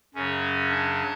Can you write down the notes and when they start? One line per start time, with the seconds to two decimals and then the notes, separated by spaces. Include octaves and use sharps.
0.14 F#2 C#3 F#3 C#4
0.70 D4